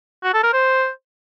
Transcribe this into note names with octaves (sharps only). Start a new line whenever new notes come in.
F#4
A4
A#4
C5